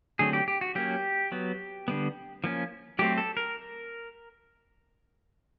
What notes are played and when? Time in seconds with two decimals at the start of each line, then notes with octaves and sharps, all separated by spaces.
0.19 D3 F#3 A3 C4 G#4
0.33 G4
0.48 G4
0.61 F#4
0.75 F#3 A#3 C#4 G4
1.32 F#3 B3
1.88 D3 G3 B3
2.44 F3 A#3 C#4
2.99 F#3 A3 C4 G4
3.18 A4
3.37 A#4